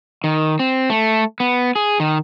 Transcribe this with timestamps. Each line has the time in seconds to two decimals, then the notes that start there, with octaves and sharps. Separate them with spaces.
0.24 D#3
0.59 C4
0.90 A3
1.40 B3
1.76 G#4
2.00 D#3